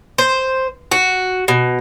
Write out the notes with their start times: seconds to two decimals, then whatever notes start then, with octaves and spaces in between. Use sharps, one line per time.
0.18 C5
0.91 F#4
1.48 B2